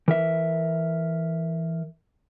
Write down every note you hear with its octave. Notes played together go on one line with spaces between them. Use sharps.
E3 A#4 E5